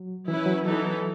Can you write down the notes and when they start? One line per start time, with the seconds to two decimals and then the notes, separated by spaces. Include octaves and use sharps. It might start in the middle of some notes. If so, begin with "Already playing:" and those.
Already playing: F#3
0.28 E3 C#4 E4 B4
0.46 F#3
0.64 E3 B3 D#4 A4